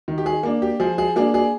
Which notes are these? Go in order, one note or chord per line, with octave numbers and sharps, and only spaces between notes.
D#3
G4
G#4
A#3 D4
G4
F3 G#4
G#4
A#3 D4 G#4
G#4